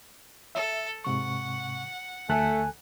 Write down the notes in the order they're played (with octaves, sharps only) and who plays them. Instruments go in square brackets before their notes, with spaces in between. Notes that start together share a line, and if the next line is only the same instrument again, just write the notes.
[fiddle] A4 [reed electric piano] E5
[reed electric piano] G#2 C3 C#6 [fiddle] F#5
[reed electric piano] D2 A4 F#6 [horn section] A3 [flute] G#5